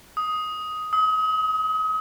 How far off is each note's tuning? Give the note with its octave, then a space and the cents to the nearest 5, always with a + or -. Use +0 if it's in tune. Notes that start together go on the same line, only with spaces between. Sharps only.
D#6 +10
D#6 +35